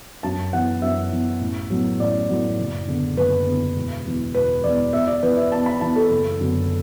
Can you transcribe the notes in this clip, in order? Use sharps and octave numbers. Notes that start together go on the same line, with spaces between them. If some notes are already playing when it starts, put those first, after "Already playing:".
F#2 A5
E3 B3 F#5
F#2 E5
E3 B3
A1
A2 F#3 B3
A1 D5
A2 F#3 B3
F#1
E2 D3
F#1 B4
E2 D3
E1
E2 E3
E1 B4
E2 E3 D5
E2 E5
D5
E3 B3 B4
E5
E2 A5
B5
E3 B3 A5
A4
F#1
F#2 D3 B3